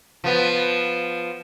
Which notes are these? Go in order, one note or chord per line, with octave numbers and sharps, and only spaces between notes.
F3 B3